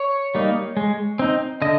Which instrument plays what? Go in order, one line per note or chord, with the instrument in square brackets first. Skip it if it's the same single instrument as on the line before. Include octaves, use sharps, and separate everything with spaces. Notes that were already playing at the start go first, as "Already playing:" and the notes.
Already playing: [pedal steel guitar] C#5
G3 A#3 D#4
G#3
C4 D#4
D3 D#5